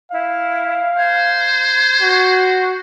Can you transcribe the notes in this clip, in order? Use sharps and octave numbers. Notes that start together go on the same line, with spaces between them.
E4 F5
C5 G#6
F#4